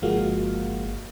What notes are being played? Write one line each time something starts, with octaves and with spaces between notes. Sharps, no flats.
G1 F3 G#3 A#3 F#4 F5